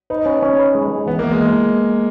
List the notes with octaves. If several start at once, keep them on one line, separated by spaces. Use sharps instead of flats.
D#4 B4
C#4
C#4
B4
G#3
G#3
E3 B3
A#3
E3
G#3